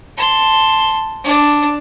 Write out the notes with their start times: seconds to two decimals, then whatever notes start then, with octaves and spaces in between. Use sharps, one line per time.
0.17 A5 C6
1.24 D4 D5